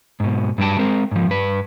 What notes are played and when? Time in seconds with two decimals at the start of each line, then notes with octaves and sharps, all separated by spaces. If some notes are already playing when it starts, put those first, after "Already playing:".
0.20 G#2 B2
0.58 G2 F#3 G3 G5 A5
0.79 G#3 C4 A#4
1.12 G#2 F3
1.27 G2 B4